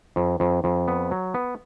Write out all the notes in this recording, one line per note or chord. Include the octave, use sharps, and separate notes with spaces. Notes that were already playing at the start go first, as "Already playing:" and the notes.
F2
F2
F2
B3
F#3
B3